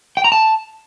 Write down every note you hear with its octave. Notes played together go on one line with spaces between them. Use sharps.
G5
A#5
A5